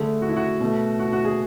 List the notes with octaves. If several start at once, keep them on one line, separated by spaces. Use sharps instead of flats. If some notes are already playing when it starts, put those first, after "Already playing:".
Already playing: D3 A3 G#4
F#4
E4
F#4
B2 A3
F#4
F#4
G#4